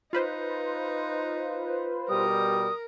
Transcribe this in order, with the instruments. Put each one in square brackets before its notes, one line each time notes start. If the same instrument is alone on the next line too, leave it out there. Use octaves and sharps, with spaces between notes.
[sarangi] D#4 [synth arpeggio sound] F4 B4 C5
[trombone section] B2 G3 [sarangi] A#4 [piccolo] D#6